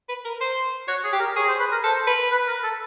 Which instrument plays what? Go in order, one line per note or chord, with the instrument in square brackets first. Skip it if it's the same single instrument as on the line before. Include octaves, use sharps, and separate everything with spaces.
[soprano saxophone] B4
A#4
C5
[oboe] F#4 [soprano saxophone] C#5
[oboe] G#4
[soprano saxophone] G4
[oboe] A#4
[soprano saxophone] G#4 [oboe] C#5
[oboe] C5
B4
A#4
[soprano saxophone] A4 [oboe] C5
[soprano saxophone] B4
[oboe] B4
A#4
A4